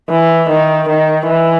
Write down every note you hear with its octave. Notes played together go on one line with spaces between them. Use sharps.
E3
D#3
D#3
E3